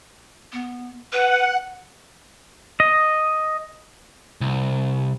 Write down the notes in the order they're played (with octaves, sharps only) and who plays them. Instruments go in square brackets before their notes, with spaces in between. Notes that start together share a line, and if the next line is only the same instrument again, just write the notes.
[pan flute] B3
[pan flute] B4 [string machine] F#5
[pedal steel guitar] D#5
[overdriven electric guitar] C2